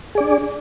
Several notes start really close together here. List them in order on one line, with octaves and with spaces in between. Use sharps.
G#4 D5 D4